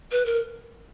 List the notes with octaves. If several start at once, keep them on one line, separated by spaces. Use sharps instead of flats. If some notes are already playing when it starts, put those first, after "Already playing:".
B4
A#4